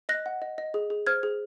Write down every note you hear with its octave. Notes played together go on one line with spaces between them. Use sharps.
D#5 F#6 A#6
F#5
D#5
D#5
G#4
G#4
C5 F6 G#6
G#4